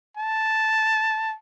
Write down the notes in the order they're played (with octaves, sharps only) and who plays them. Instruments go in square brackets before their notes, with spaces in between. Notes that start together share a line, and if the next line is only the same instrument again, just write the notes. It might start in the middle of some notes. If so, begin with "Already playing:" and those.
[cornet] A5